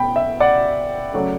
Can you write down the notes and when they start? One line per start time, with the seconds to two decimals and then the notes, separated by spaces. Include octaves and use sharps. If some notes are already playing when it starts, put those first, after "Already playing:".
Already playing: B2 G5 B5
0.16 E5
0.40 D5 F#5
1.13 C#3 F#3 A3